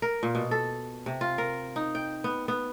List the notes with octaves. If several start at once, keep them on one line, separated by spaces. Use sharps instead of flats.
A#4
A#2
B2
A4
C3
F4
A#4
D#4
G5
B3
B3